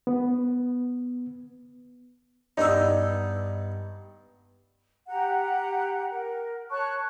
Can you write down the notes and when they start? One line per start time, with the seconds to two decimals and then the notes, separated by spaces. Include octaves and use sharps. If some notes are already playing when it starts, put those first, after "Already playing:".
0.07 B3
2.57 G2 B3 D4 D#4 E6
5.08 G4 F#5 A#5
6.10 A#4
6.70 C#5 A5 C#6 F#6